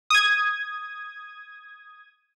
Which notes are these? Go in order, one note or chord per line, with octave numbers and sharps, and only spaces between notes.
D#6 G#6